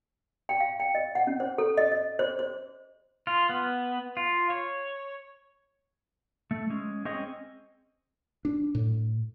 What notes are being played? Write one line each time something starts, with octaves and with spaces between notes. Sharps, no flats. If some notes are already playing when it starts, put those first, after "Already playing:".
G5
F5
G5
D#5
F#5
C#4
C5
A4
D#5
D#5
C5
C5
F4
B3
F4
C#5
A3
G#3 C#4
C4 C#4 G#4 D#5
D4
A2